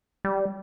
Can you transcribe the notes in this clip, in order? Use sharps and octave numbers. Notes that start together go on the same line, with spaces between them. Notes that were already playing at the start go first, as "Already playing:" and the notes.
G3